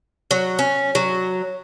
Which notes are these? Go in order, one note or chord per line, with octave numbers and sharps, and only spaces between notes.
F#3
C#4
F#3